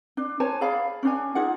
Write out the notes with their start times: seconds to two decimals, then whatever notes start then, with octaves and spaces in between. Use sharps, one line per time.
0.17 D4
0.40 C5 C#5 G#5 A5
0.61 G#4 D5 F5 B5
1.03 C#4 D4 G#5
1.35 D#4 F4 G#4 F#5